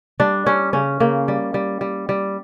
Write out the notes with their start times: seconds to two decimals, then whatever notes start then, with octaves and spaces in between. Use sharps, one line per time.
0.20 G3 D4
0.46 G3 C#4
0.73 C#3 C#4
1.00 C#3 A#3
1.28 G3
1.54 G3
1.81 G3
2.09 G3